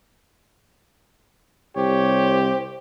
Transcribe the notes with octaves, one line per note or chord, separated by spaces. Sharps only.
C2 G4 C5 C#5